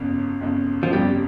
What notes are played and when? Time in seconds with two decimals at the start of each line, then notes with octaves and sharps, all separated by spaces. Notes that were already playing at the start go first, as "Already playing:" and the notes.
Already playing: G1 F2 C#3
0.41 G1 F2 C#3
0.83 F3
0.93 G1 F2 C#3 G3